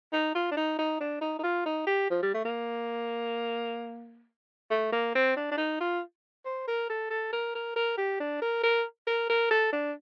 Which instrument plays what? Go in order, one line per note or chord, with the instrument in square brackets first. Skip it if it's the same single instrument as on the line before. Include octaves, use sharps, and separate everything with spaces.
[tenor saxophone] D#4
F4
D4
D#4
D#4
D4
D#4
D#4
F4
D#4
G4
F3
G3
A3
A#3
A3
A#3
C4
D4
D4
D#4
F4
C5
A#4
A4
A4
A#4
A#4
A#4
G4
D4
A#4
A#4
A#4
A#4
A4
D4